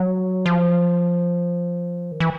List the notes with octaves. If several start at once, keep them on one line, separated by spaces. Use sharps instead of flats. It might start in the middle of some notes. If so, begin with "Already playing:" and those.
Already playing: F#3
F3
D#3
E3